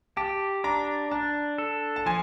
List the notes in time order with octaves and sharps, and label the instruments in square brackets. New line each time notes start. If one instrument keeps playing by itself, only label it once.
[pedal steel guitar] G4 [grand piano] A5
[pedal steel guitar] D4 [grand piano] A#5
[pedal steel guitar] D4 [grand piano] A5
[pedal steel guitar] A4
[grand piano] A5
[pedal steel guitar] F3 [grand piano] G#5